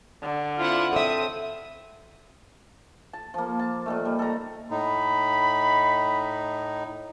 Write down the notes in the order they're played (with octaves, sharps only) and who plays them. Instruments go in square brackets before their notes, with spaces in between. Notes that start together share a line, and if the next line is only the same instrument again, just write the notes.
[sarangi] D3
[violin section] C4 E4 F#5 [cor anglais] F4
[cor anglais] C4 [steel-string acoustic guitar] A4 E5 [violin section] C#5 D#6
[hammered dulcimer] A5
F3 A#3
A5
A#2 D#3 A3
G3
A4 A#5
[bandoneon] A2 D#4 [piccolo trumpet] B5